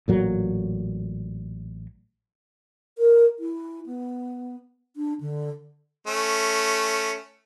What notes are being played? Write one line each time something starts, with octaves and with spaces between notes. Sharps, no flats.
A1 A#2 F#3
A#4
E4
B3
D4
D3
A3 C#4